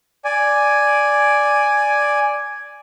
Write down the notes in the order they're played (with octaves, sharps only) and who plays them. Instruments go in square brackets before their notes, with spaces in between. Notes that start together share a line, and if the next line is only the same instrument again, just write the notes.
[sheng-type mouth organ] D5 G#5